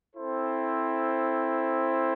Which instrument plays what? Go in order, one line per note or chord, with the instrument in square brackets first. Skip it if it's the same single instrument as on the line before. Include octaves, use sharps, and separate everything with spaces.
[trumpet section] C4 E4 A4 C5